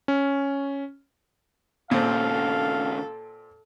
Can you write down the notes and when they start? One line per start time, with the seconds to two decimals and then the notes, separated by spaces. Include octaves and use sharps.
0.08 C#4
1.91 D#2 A#2 C#3 C4 A4 F5